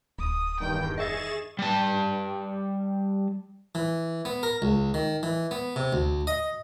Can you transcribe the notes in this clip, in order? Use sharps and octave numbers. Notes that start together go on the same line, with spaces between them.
D1 D#6
E2 G2 D#3 G5
G#4 D#5 E5 C#6 A6 E7
G3 A5
E3
B3
A#4
C#2
D#3
E3
B3
C3
D2
D#5